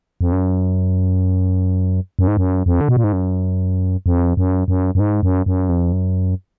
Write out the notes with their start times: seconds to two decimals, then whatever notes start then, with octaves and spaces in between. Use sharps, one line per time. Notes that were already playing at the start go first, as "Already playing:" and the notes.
0.21 F2
0.32 F#2
2.19 F#2
2.28 G#2
2.37 F#2
2.66 F2
2.81 D3
2.89 B2
2.96 A#2
3.04 G#2
3.13 F#2
4.06 F2
4.37 F#2
4.68 F#2
4.95 F#2
5.00 G#2
5.23 F#2
5.46 F#2
5.69 F2
5.93 F#2